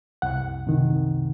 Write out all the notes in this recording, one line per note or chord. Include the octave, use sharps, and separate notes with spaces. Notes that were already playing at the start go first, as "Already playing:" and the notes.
C2 F#5
C3 D#3